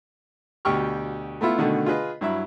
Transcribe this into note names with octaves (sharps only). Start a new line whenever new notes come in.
D2 B2 G4 G5 C#6 F6
A3 B3 E4 F4 E5
B2 D3 D#3 A3
F4 G#4 B4 D#5
G2 F#3 E4 E5